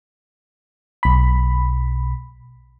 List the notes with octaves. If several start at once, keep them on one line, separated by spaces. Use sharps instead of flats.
B1 B5